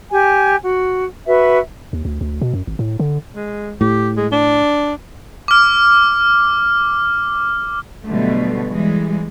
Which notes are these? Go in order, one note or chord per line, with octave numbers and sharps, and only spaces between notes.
G4 G#5
F#4
F#4 B4 E5
D#2
D2
D2
B2
F#2
G#1
A2
D3
G#3
A2 G4
G#3
D4
D6 F6
B2 D3 F#3 G3 A3
E3 G3 G#3